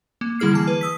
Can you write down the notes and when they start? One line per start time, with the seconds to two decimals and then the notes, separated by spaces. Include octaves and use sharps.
0.21 A#3
0.39 D3 G3 E4 G#4 F6 C7
0.54 E3 A#3 A5
0.67 B4
0.81 D#6 E6 B6